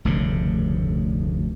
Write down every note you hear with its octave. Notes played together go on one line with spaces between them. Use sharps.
F1 D2 G2 C#3